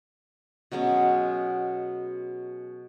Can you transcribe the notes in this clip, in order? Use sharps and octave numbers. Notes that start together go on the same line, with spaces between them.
B2 F#3 G#3 C#4